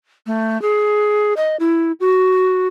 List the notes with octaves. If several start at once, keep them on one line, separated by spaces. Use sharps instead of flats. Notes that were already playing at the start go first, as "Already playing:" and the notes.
A3
G#4
D#5
E4
F#4